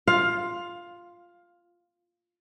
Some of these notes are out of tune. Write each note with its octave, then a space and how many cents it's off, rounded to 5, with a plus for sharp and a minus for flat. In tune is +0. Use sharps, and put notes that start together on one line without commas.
F4 +0 F5 +15